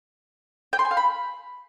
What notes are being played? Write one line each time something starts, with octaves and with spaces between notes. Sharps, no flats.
G5
C6
G#5
F5
B5